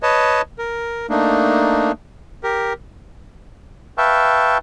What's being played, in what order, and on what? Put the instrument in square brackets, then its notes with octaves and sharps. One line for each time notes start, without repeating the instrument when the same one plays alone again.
[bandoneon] B4 C#5 D#5 A5
A#4
A3 A#3 D4 D#4
G4 A#4
[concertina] B4 E5 F5 G5 A5 C#6